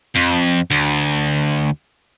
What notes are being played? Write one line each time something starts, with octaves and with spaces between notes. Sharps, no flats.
F2
D2